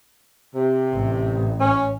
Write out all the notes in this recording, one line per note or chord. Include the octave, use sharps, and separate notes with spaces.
C3
A1
C#4